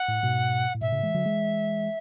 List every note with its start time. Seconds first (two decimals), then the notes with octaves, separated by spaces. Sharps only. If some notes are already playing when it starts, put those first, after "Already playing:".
Already playing: F#5
0.08 A2
0.23 G#2 B2
0.75 A2
0.81 G#2 B2 E5
0.92 A2 C#3
1.03 E3 G#3
1.14 D3 F#3
1.25 E3 G#3